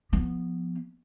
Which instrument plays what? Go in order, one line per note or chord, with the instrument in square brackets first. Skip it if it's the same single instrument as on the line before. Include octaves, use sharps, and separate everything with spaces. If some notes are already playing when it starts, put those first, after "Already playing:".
[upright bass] F3 B3